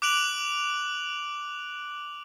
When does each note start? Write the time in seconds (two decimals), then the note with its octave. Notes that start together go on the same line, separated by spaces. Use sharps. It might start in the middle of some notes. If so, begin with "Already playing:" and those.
0.02 D6 F#6 D7 F7 F#7